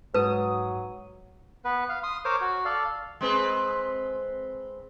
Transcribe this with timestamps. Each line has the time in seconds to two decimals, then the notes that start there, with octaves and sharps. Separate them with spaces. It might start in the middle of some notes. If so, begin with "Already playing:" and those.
0.14 G#2 F#3 B4 D#6
1.65 B3 B4
1.89 F5
2.03 C6 D#6
2.25 A#4 C5 C#5 D6
2.41 F#4
2.65 A4 D5 F5
3.21 G#3 C4 B4